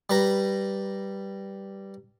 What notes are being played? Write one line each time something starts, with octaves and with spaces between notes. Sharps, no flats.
G3 B4 A#5